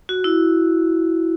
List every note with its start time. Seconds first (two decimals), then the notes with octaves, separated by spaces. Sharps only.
0.09 F#4
0.24 E4